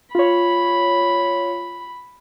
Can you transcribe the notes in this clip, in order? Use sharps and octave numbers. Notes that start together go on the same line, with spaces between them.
F4 C#5 B5